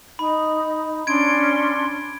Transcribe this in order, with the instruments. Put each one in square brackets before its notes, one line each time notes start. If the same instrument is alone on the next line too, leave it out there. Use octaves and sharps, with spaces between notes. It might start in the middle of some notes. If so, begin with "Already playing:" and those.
[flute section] D#4 [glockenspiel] B5
[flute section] C#4 D4 C6 [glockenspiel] G#6 D7